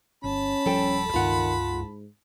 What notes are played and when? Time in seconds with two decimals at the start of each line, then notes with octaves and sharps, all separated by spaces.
0.24 G1 C#4 A5 B5
0.66 D#1 F3 G3 A4 G5
1.13 C#2 G2 D#3 F4 F#5
1.70 G#2